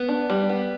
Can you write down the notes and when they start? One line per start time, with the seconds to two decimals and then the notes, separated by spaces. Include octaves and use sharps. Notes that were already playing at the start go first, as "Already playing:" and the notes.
Already playing: B3
0.08 D4
0.30 G3
0.49 B3